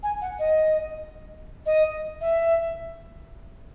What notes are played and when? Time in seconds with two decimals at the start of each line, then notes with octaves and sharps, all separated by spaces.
0.03 G#5
0.21 F#5
0.39 D#5
1.66 D#5
2.21 E5